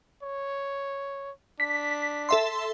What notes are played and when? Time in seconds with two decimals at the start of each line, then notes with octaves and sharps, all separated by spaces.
0.23 C#5
1.60 D4 B6
2.29 A4 E5 C6